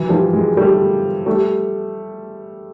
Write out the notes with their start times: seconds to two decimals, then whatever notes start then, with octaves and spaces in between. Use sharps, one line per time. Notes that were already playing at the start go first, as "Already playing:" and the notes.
Already playing: E3 F#3
0.09 F3 G3
0.33 F#3 G#3
0.57 G3 A3
1.26 G3 A3